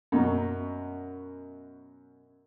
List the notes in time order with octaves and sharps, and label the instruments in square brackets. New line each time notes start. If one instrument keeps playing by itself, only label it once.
[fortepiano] F#2 B2